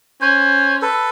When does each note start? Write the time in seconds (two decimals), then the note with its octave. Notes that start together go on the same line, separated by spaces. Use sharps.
0.21 C#4 C5
0.82 A4 B4